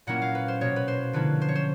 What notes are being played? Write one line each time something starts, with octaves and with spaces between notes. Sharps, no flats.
A#2 F#3 A#3 C#4 E4 F#5
F5
B4
C5
B2 F#3 A#3 C#5
B4
C5
D3 F3 A#3 C#4 E4 B4
C5
C#5
C5